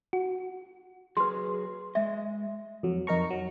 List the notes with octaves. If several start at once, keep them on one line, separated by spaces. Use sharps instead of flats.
F#4
F#3 G#4 B4 C6
G#3 D#5 E5
F2 F#3
F2 D#4 A#4 A#5 C#6
F#3